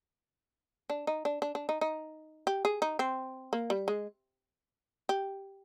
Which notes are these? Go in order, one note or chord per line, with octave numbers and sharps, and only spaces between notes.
D4
D#4
D4
D4
D4
D#4
D#4
G4
G#4
D#4
C4
A#3
G3
G#3
G4